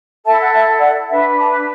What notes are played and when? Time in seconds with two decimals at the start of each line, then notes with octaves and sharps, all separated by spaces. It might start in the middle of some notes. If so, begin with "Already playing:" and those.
0.24 E4 A4 E5 A5
0.40 F#5
0.52 E5 A5
0.80 D5 F#5
1.09 D4 B4 E5
1.36 A5 D6